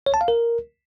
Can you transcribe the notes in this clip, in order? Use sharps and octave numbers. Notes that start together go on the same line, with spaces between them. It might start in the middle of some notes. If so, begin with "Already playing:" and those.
C#5
A5
F5
A#4